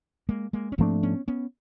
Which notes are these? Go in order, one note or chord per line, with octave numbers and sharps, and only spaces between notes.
G#3 A#3
G#3 A#3
C#4
G#2 F3 A3 A#3 C4 D4
B3 C#4
B3 C#4